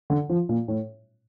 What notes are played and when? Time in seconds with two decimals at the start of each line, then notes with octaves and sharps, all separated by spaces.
0.10 D3
0.29 F3
0.49 A#2
0.68 A2